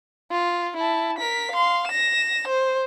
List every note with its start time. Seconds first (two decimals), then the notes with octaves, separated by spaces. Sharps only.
0.31 F4
0.77 E4 A5
1.18 A#4 B6
1.51 F5 C6
1.87 A#6 E7
2.48 C5